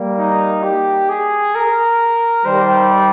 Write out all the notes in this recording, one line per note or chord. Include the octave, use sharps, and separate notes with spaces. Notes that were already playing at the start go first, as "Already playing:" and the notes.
Already playing: G3 A#3
D#4
G4
G#4
A#4
D#3 G3 C5